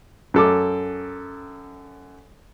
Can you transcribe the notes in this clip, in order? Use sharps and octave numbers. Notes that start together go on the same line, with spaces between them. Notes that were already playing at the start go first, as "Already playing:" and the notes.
F#2 A4 D6